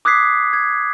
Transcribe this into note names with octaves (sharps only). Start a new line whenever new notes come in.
D6 D#6 F#6 G#6 B6 C7
G#6